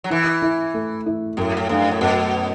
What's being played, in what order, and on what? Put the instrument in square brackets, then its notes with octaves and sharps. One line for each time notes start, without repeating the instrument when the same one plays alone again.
[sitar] F#3
[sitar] E3 [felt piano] E4
[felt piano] E4
A3
E4
[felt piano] F#2 [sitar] A2
[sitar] A2
[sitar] G2 [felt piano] A3
[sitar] A2
[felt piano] F#2 [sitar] B2